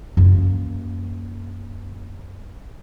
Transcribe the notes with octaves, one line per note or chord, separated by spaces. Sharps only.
F#2 A#3